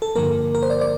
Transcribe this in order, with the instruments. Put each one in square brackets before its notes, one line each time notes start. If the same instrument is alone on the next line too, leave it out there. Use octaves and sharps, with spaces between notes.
[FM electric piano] A4
G2 D3 F3 A#3 A#4
A#4
C5
D5
D5